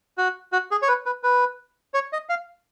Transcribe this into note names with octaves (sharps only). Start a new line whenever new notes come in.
F#4
F#4
G#4
C#5
B4
B4
B4
C#5
D#5
F5